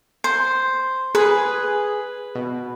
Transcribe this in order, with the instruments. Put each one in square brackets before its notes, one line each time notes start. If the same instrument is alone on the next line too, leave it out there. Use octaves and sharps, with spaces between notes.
[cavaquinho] C5
[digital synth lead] G#4 [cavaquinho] B4
[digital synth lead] B2